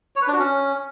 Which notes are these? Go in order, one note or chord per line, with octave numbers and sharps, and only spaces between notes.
C#5
B4
D4
F#4
C#4